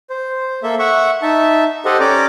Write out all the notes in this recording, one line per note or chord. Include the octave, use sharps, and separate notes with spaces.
C5
A#3 A4 E5
E5 F#5 C#6
D#4 E5 A5
G4 A4 C5 D#5 F#5
C#4 D5 G5 A#5 D6